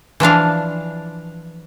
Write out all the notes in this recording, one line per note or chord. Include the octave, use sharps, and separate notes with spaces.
E3 F3 D4 F5